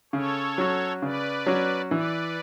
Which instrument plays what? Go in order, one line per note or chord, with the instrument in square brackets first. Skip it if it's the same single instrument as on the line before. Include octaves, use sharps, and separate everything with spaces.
[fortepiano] C#3 [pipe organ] A4 C#5
[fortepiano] F#3 C#4 F#4
[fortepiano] C#3 [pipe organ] B4 D5
[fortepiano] F#3 C#4 F#4
[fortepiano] E3 [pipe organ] B4 D5